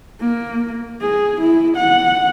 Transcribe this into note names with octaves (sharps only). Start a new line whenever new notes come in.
A#3
G#4
E4
F#5